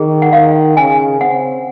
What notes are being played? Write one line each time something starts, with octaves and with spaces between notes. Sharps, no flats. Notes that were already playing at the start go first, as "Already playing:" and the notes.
Already playing: D#3 G#4
F#5
D#3 F5
C#3 G#5
C4 F#5